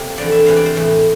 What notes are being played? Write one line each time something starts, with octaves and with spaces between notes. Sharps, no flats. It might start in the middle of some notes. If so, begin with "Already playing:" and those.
Already playing: C3 A#3
E2 D3 F3 D5
E5
E2 C3 E3 F5
D5
C5
A2 E3 A3